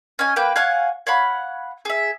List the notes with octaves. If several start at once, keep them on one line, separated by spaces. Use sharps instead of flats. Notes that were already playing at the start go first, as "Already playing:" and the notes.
C#4 D#5 G#5
A#3 B4 G5
C#5 F5 F#5 G#5
C#5 F5 F#5 B5
G#4 E5